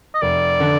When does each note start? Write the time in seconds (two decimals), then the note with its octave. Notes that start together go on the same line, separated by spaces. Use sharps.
0.15 D#5
0.22 F1 D5
0.60 D3